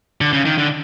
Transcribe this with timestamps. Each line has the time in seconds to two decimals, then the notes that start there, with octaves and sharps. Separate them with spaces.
0.21 D3
0.33 C#3
0.45 D#3
0.58 D3